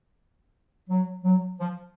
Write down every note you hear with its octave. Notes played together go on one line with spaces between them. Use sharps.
F#3
F#3
F3